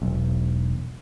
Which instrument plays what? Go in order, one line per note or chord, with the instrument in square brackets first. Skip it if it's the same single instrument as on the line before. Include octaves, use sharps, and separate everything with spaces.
[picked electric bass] E1 B1